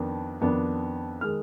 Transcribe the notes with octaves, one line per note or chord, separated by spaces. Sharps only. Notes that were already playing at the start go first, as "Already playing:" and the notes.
Already playing: F2 D#3 B3 D4
F2 D#3 B3 D4
D#3 G#3 F6